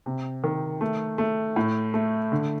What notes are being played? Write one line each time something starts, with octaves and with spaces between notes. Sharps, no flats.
C3
D#3
A3
A3
A2
A3
D3